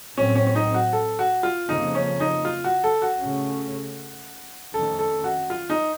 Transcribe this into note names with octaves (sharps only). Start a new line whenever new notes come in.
A2 F#3 C4 C#4
C#4
C#4
D#4
F#4
A4
F#4
F4
F2 C#3 F3 A#3 D#4
C#4
D#4
F4
F#4
A4
F#4
C#3 A3 C#4
F2 D#3 A3 C#4 A4
A4
F#4
F4
D#4